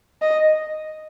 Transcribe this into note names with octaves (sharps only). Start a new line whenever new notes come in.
D#5